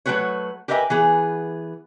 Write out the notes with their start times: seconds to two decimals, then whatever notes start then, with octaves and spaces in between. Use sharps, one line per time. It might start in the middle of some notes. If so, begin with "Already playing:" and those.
0.06 F#3 G3 A3 F#4 B4 C#5
0.68 G4 A#4 B4 D#5 E5 G#5
0.90 E3 B3 G#4